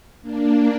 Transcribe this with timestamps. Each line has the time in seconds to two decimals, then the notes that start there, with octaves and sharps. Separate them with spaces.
0.22 A#3 D4